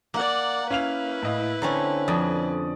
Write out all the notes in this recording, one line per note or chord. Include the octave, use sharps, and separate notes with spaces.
A#3 D5 F#5
C#4 E4 B4 F5 F7
A2 D#5 F5
D3 C4 C#4 A#5
F2 D5 D#6